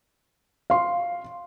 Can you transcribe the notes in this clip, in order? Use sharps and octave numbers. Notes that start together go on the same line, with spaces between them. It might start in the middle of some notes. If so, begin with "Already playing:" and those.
F5 C6